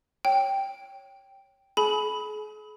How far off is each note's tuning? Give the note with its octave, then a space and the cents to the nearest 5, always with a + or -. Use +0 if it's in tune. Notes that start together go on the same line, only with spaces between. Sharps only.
C#5 +0 G5 +0
G#4 +45 G#5 +40 B5 +0